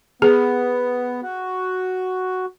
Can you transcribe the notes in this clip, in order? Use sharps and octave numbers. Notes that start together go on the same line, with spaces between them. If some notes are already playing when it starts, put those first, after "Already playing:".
B3 G#4
F#4